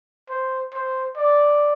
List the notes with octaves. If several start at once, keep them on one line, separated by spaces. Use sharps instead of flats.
C5
C5
D5